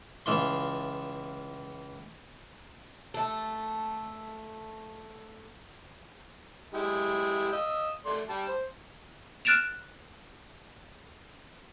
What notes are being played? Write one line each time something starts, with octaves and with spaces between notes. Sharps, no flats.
C#2 E3 F4 C6
A3 A4
G#3 E4 G4
D#5 E6
A3 D5 C6
G3 A5
C5
F6 F#6 A6 D7 E7 F7